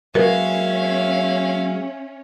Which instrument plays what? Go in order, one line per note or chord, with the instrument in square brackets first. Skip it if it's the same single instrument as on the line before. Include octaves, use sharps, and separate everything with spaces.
[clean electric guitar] F#3 G#3 A#3 [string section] C#4 [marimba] A#4 B4 [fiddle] E5 F5